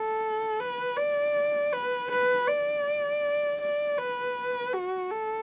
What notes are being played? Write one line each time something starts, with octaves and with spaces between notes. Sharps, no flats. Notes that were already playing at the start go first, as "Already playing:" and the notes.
Already playing: A4
B4
D5
B4
B4
D5
D5
B4
F#4
A4